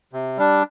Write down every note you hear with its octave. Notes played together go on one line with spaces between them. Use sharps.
C3
G3 D4